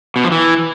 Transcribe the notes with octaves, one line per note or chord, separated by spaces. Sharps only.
B2
F3
E3